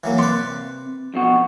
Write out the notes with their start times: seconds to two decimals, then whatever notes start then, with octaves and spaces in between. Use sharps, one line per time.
0.04 E3 F#3 A#3
0.18 C3 B4 D5 C6
1.14 F2 B2 F#4